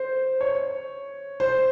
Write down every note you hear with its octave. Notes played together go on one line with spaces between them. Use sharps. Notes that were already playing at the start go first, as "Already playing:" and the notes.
Already playing: C5
C#5
C5